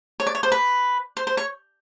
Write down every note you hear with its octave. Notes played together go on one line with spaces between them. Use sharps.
C#5
D5
C#5
C5
B4
C5
C5
C#5